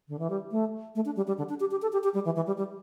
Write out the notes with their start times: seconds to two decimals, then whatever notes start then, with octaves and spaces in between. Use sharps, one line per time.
0.08 D3
0.19 E3
0.30 G3
0.51 A3
0.95 A3
1.05 D4
1.16 G3
1.27 G3
1.38 D3
1.49 D4
1.60 G4
1.71 G4
1.82 A4
1.93 G4
2.04 G4
2.14 G3
2.25 E3
2.36 E3
2.47 G3
2.58 G3